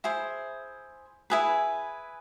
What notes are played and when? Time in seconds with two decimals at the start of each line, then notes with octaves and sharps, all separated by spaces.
0.04 E4 G#4 C5
1.30 E4 G#4 B4